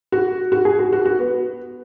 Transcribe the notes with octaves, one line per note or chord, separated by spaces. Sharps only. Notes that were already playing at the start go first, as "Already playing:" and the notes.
F#4
F#4
G#4
F#4
F#4
F#4
B3